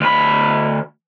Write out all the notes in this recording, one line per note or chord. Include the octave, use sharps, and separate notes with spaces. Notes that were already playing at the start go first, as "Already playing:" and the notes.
D2 B5